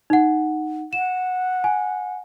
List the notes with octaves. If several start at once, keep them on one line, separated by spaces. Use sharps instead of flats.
D#4 F#5
F#5 E7
G#5